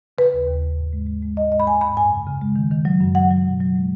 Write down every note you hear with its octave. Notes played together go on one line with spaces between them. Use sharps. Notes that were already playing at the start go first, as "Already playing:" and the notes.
C#3 B4
D#2
D#2
D#2
G#2
G#3
G#3
G#3
G#2 D#5
G#3 D#5
B5
G#2 G#5
G#2 B5
F#2 G#5
C#3
C#3
G#3
D#3
D#3
F#3
F#2
F#3 F#5
F#3
B2
F#3
G#3